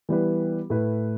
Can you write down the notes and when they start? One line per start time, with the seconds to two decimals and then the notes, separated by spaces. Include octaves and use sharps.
0.09 E3 G3 B3 E4 B4
0.70 A2 A3 E4 B4